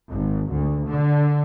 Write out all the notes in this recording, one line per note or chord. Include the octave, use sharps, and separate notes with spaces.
G#1
D2
D3